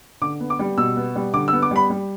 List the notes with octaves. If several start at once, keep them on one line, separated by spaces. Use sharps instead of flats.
D3 D6
B3
D6
G3
B2 E6
B3
G3
D3 D6
E6
B3
D6
G3 B5
G3